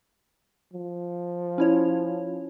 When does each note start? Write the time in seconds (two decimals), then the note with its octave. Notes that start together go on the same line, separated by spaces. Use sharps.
0.73 F3
1.58 C#4 E4 C#5